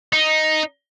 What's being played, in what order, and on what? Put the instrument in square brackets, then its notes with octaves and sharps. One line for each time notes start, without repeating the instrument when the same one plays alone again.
[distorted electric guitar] D#4